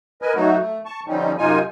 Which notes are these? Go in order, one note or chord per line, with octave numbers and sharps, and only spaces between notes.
A#4 B4 D#5 G#5
F#3 A3 D#4 F#4
A3
A5 C#6
D3 F3 G3 C4 C#4 D#4
F#2 C3 D#4 F4 G#5